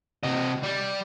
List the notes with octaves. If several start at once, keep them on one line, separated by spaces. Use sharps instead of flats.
C3 D#5
G3